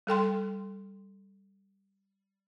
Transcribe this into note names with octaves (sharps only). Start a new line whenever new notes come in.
G3 A4 G5 C6